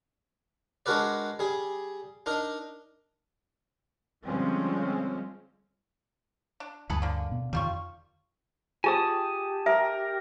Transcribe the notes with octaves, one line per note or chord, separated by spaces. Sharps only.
G#3 D4 F#4 A#4 B4 D5
G3 G#4
D4 D#4 A#4
D3 F3 G3 G#3 C4 C#4
D4
D2 G2 G#4 A4 B4
D3 A#3
B2
F2 D#3 G3 F4 C#6
F4 G4 G#4 B4 G#5 A5 D#6
A#4 E5